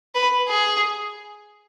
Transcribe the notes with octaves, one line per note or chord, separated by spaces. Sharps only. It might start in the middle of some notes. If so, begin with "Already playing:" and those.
B4
G#4